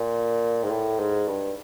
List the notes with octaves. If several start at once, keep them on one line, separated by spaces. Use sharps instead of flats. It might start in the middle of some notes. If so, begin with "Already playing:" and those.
Already playing: A#2
G#2
A2
G#2
G2